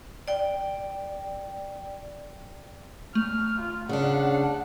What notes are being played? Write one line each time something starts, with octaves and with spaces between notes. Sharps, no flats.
D5 G5
A3 F6
F4
C#3 D4 F#5